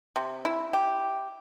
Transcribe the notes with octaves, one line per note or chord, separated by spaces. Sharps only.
C3
E4
G4